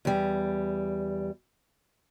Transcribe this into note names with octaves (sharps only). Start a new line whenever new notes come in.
E2 G3